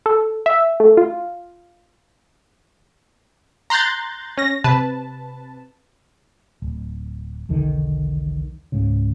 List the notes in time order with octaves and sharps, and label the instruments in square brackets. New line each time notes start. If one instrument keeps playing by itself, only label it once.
[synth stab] A4
E5
A3
F4
A#5 C6 F#6 G6 A6
C#4 A#6
C3 B4 A5
[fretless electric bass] D1
E1 B1 D3 D#3
C#2 G#2 C#3